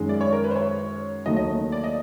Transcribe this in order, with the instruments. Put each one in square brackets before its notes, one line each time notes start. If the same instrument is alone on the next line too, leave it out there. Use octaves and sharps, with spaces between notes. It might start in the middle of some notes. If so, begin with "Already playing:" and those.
Already playing: [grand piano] F#2 D#3 G#3
[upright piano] D5
C#5
A#4
B4
C5
C#5
[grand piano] D#2 D#3 F#3 A3 [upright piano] D#5
[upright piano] D#5
D5
D#5